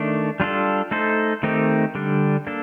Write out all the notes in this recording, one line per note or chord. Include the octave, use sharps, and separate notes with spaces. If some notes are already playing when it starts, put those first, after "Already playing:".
Already playing: D#3 A3 D4
G3 D4 F4 A4
A3 D#4 A4 C5
D#3 A3 C4 D#4 G4
D3 G3 D4
A#3 D4 A4